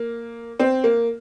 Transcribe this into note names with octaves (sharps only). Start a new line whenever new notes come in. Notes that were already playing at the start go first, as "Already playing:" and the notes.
Already playing: A#3
C4
A#3